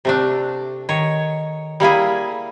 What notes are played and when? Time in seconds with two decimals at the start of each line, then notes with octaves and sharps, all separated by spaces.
0.05 C3 A3 D4
0.89 D#3 C#5
1.80 G3 A#3 E4 G#4